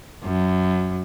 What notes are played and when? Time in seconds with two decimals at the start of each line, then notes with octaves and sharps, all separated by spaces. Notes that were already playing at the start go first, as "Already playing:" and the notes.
0.23 F#2